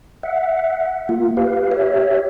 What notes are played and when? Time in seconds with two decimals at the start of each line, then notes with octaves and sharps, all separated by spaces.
0.23 E5 F#5
1.09 A#3 F4
1.37 G4 B4 F5
1.72 G4 C#5 E5